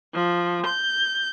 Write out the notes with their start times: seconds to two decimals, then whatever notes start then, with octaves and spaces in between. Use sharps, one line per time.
0.14 F3
0.66 G6